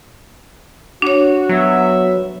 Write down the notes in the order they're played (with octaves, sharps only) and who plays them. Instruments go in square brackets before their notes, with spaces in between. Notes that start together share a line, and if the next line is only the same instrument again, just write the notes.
[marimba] D4 C#5 [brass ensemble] F#4
[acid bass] F#3 [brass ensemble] B3 F#4 E5